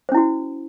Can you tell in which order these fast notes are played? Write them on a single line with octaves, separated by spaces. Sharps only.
C5 C#4 E4 F#4